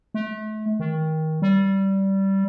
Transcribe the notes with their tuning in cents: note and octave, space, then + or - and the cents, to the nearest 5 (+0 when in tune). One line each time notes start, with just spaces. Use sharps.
A3 -35
D#3 +20
G3 -15